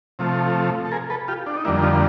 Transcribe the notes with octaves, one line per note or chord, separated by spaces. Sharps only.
C3 F3 A3
A4
G#4 A#4
A4 B4
F4 G4
D4
D#4
F2 D3 G3 A#3 D4 E4
D#4 F4